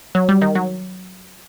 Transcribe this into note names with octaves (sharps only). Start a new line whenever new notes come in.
F#3
G3
D#3
F#3